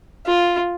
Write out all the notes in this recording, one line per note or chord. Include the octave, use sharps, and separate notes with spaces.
F4